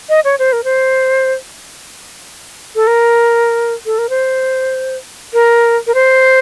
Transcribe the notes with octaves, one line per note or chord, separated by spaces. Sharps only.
D#5
C#5
C5
A#4
C5
A4
A#4
A4
A#4
C5
A#4
A#4
C5